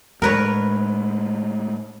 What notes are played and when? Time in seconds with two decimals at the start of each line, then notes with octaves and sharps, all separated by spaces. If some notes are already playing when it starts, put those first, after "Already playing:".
0.22 A2 G#3 A#4 B4 C#5